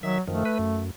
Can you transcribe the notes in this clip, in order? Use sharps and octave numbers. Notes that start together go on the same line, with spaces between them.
D#3 F#3 E5
F#2 D#3 F3 A3
B4
F#2